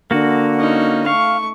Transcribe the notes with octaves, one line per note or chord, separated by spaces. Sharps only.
D3 A#3 F#4
C#4 D#4
A3 F5 C#6